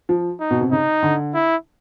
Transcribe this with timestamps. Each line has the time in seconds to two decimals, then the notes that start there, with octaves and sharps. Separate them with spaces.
0.09 F3
0.40 D#4
0.51 B2
0.61 C3
0.72 C#3 D#4
1.03 D3
1.34 E4